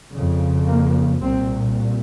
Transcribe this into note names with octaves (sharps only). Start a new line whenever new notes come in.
F2 C#3
A#3
C2 A#2 C4